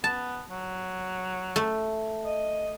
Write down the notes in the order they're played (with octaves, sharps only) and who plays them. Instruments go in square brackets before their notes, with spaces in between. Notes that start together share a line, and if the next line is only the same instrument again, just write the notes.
[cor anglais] B3 [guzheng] A5
[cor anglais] F#3
[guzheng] A3
[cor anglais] D#5